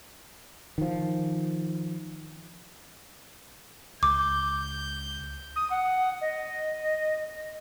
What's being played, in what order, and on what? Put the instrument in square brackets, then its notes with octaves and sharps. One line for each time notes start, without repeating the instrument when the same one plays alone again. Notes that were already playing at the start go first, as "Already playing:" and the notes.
[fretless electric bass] D#3 F3
[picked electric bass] C#2 [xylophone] D6 [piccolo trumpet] G6
[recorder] D#6
F#5
D#5